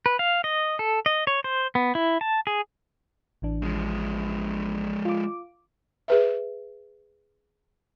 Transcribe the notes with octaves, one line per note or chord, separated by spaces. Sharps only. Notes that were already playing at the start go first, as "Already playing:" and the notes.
B4
F5
D#5
A4
D#5
C#5
C5
B3
E4
A5
G#4
A1 E3 D4
F3 G#3
F4 D6
G#4 B4 E5